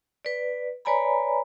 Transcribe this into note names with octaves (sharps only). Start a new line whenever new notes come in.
B4 D5
B4 C#5 D5 G#5 A#5 B5